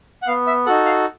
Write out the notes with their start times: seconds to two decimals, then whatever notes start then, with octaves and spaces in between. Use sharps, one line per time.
0.22 F#5
0.27 B3 F5
0.47 E5
0.66 D#4 F#4 A4 F#5
0.86 F5